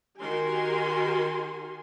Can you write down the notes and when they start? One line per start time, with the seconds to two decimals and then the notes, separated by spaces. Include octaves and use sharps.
0.20 D#3 F#4 G4 A#4 G#5 C6